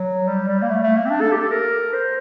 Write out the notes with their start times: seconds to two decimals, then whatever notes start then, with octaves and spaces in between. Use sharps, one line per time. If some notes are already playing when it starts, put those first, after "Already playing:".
Already playing: F#3
0.28 G3
0.48 G3
0.62 A#3
0.70 A3
0.83 A3
0.97 A#3
1.06 C4
1.10 D4
1.21 A4
1.32 G4
1.42 A4
1.52 A#4
1.93 C5